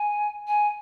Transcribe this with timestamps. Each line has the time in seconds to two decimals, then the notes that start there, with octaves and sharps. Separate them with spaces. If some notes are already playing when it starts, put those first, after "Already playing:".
Already playing: G#5
0.47 G#5